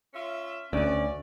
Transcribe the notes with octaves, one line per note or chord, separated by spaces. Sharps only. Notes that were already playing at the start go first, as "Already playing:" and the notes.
C#4 F4 E5
D2 C#4 D5